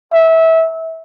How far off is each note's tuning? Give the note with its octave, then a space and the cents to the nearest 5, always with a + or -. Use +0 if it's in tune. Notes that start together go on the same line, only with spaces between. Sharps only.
E5 -20